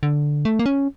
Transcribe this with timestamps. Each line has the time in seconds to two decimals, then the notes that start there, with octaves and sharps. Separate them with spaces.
0.03 D3
0.45 A3
0.59 A#3
0.66 C#4